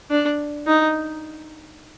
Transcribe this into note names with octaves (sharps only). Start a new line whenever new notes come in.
D4
D#4